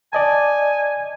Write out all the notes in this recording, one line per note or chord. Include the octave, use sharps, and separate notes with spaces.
D5 D#5 G#5 A5